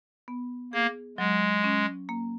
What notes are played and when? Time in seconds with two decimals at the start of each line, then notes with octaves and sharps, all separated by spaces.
0.28 B3
0.73 A#3 G#4
1.18 F#3 G#3
1.64 C#4
2.09 A#3